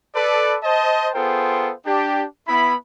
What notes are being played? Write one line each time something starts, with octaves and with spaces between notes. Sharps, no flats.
A4 B4 D5
C5 D#5 A5
B3 F4 G#4 A4 C5 G5
D4 G4
B3 E4 B5